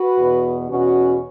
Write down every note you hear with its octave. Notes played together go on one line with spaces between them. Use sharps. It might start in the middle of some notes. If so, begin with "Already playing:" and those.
Already playing: F#4 B4
E2 B2
E2 B2 C#4 F#4